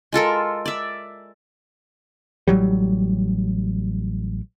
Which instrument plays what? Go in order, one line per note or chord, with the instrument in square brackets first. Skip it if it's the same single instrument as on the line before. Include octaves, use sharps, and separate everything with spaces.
[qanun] G#3 F4 A4 A#4
D5 E5
[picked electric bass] A1 F#3 G3